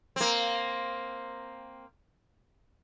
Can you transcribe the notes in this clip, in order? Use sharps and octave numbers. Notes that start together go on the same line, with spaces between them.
A#3 C4